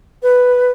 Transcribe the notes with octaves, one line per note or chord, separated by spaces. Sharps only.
B4